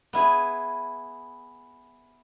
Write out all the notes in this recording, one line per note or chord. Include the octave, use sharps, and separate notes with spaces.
B3 E4 G#4